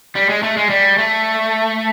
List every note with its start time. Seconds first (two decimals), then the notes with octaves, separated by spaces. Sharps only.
0.16 G3
0.30 G#3
0.43 A3
0.58 G#3
0.70 G3
0.98 A3